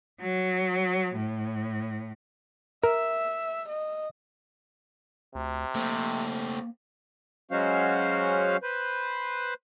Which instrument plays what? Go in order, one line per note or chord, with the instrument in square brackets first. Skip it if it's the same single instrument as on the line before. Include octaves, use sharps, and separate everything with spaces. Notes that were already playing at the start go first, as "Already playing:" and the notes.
[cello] F#3
A2
[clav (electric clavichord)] A#4 [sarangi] E5
[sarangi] D#5
[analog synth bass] D2 [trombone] C3
[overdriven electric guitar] A3 C4 [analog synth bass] A#3
[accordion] F#3 G#3 C#4 F#4 C5 F5
B4 C5